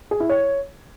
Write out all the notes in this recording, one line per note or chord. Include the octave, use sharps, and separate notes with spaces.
G#4
E4
C#5